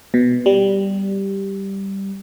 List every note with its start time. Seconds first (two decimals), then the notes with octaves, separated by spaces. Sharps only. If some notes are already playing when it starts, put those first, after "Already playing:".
0.14 B2
0.46 G3